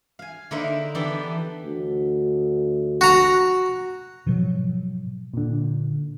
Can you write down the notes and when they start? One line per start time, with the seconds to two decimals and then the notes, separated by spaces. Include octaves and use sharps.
0.19 F5 G#5
0.51 D3 A#3 D#4 E4 C5 E5
0.95 E3 B3 D4 G4 A4
1.65 D2
3.01 F#4 A#5
4.26 G#2 B2 F3 F#3
5.34 A#2 D3